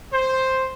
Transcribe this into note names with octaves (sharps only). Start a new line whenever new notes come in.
C5